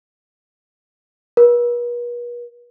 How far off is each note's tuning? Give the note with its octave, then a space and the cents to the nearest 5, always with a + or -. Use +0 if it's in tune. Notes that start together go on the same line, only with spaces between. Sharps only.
B4 -45